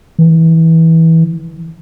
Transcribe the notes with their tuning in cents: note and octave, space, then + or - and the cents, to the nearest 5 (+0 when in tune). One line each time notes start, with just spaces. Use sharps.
E3 -20